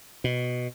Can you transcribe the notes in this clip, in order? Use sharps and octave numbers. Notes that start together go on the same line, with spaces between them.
B2